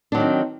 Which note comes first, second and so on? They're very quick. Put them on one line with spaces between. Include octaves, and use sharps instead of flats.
D4 F#3 D#3 C4